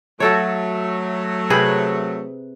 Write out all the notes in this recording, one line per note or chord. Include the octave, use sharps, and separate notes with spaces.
F#3 A3 F#4 A4 C#5
C3 G#4 B4